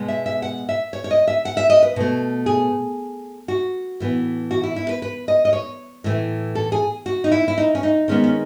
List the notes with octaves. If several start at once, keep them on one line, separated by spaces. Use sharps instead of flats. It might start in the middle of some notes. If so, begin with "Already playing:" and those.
Already playing: B2 G#3 B3
E5
E5
F#5
E5
C#5
C#5
D#5
E5
F#5
E5
D#5
B4
B2 A3
G#4
F#4
A2 E3 B3
F#4
E4
E4
B4
B4
D#5
D#5
C#5
A2 E3 A3
A4
G#4
F#4
D#4
E4
E4
D#4
C#4
D#4
D#3 G#3 B3 C#4
C#4